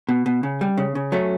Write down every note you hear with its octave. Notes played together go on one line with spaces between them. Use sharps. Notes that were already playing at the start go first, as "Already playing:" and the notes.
B2
B2
C#3
G3
C#3
C#3
F#3 A3 C#4